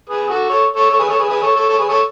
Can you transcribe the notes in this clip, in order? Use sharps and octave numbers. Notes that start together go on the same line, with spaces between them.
G#4 B4
F#4 A4
A4 C#5
A4 C#5
A4 C#5
G#4 B4
A4 C#5
G#4 B4
G#4 B4
A4 C#5
A4 C#5
A4 C#5
G#4 B4
A4 C#5